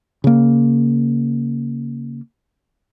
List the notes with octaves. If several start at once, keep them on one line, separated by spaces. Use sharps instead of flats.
C#3 A#3